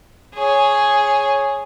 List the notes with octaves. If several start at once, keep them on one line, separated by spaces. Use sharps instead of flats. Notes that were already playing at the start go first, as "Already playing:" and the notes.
G#4 C#5